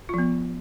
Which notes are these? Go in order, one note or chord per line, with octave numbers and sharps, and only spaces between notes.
F3 B3 F4